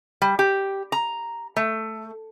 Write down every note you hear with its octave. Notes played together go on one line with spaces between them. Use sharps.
G3
G4
A#5
A3